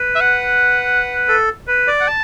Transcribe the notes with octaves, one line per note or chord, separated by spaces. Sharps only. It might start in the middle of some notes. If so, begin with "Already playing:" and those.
Already playing: B4
E5
F#5
A4
B4
D5
F#5
A5